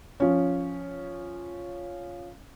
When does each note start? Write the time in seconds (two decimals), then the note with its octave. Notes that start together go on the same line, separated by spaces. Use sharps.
0.20 F3 C#4